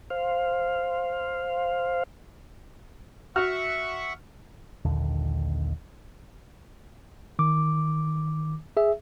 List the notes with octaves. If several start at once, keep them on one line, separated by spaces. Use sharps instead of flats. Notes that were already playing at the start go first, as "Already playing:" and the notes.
C5 F5
F#4 E5 F#5 C#6 F6
D#1 A#1 D#2 D3
D#3 D6
G#4 E5